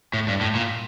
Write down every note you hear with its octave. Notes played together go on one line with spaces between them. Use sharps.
A2
G2
A2
A#2